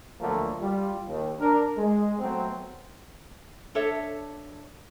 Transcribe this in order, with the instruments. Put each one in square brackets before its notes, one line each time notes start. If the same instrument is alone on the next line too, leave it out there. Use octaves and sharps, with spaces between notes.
[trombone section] D2 D3 F3 F#3 A3 A#3
G3 F4
D#2
D4 A#4
G#3
F#3 A3 B3 C4
[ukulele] D4 A4 C#5 E5